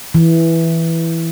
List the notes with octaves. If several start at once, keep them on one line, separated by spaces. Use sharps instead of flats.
E3